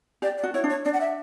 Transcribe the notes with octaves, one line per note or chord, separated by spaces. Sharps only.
G4 D5
D5
F#4
E4 C#5
D4
C#5
D4 D5
F#5
E5